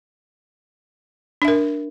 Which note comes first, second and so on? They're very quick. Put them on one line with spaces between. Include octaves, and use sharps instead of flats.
D4 E5 A#4